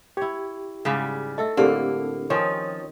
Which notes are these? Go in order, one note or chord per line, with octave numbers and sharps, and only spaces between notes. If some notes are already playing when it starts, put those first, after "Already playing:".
E4 G4 C#5
G#2 C#3 G3
A3 A4 D#5 E5
A2 D3 A#3 C4 D4 G4 A4 D5
D#3 F3 C4 C#4 C#5 D#6